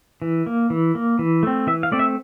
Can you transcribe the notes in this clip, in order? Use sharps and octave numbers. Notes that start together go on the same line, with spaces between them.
E3
A#3
E3
A#3
E3
A3 C4
E3 E5
F5
A3 C4 D5
E5